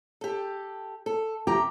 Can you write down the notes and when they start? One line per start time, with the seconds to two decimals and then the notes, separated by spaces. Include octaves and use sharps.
0.21 G4 A4
1.06 A4
1.47 C3 G4 A#5